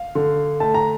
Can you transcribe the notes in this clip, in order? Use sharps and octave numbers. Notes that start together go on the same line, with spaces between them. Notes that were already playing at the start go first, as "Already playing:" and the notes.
Already playing: F5
D3
A3 A5
A#5